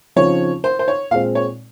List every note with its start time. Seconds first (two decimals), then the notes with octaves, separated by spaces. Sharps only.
0.16 C#3 F3 C4 D#4 C#5
0.64 C5
0.79 C5
0.88 C#5
1.11 A#2 G#3 C4 F5
1.35 C#5